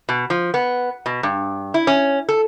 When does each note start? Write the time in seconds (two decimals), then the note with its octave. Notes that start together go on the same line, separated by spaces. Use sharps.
0.09 B2
0.30 F3
0.54 B3
1.06 B2
1.23 G2
1.74 E4
1.87 C#4
2.29 A4